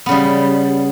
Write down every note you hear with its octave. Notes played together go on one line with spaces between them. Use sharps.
C#3 G3 B3